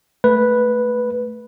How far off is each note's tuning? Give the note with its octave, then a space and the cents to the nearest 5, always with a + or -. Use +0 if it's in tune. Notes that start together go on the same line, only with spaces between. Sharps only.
A3 +0 B4 -5